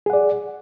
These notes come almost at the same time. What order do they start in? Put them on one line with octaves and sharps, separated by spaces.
G#4 F#5 D5